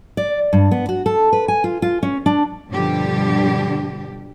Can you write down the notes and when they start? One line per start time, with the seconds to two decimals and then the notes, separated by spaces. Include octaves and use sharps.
0.17 D5
0.53 G2
0.71 B3
0.89 F#4
1.06 A4
1.33 B4
1.48 G#5
1.64 F4
1.82 F4
2.03 C#4
2.26 D4
2.71 G2 B2 D3 F3 G3 G4